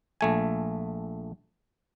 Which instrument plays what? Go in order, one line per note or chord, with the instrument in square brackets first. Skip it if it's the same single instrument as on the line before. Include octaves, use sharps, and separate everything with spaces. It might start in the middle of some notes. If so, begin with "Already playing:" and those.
[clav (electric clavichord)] A#1 A3 G#5